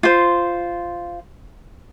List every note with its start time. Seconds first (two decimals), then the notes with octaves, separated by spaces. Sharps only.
0.03 F4 C5